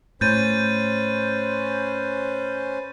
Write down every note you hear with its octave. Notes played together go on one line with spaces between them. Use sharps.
A2 C#4 B4 C5 G6 A6 D#7